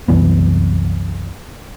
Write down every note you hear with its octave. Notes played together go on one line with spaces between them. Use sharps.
C2 F#2 E3 B3